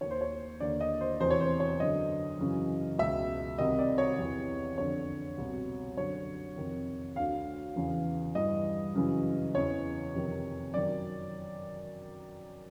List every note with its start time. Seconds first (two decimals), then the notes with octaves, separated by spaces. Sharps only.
0.01 D#2 D#3 C#5
0.11 C5
0.21 C#5
0.60 D#2 D3 D5
0.80 D#5
1.00 C5
1.20 E2 C3 E3 C5
1.30 C#5
1.40 C5
1.60 C#5
1.79 F#2 D3 D#5
2.39 F#2 C#3 E3
2.99 C#2 B2 E5
3.58 C2 C3 D#3 D#5
3.79 D5
3.98 C#5
4.18 E2 C3 E3
4.78 F2 D3 C#5
5.38 C2 B2
5.97 F#2 D3 C#5
6.56 F2 C3 D#3
7.16 D2 D3 F5
7.76 E2 C#3 E3
8.35 G2 E3 D#5
8.94 F#2 C#3 E3
9.55 E2 C#3 E3 C#5
10.14 F2 C3 D#3
10.74 F#2 D#3 D5